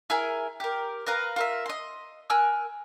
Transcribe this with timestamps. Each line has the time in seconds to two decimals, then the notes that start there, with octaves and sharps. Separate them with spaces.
0.10 E4 G#4 A#4 G#5
0.60 G4 A#4
1.06 A#4 B4 F5 A#5
1.36 F4 A#4 E5
1.66 D#5 C6
2.30 A#4 G#5 E6 F#6